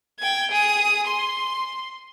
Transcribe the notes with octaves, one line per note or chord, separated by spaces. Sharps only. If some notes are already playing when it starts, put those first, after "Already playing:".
G5 G#6
G#4 D#6
C6